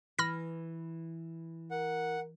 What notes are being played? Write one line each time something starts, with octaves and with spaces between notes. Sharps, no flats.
E3 B5 F6 A#6
A#4 F#5